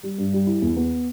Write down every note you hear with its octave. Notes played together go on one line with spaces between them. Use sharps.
G3
G2
G3
E4
E2
B3